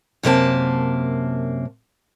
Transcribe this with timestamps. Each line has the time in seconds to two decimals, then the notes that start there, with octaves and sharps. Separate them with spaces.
0.23 F#2 C3 A#3 A5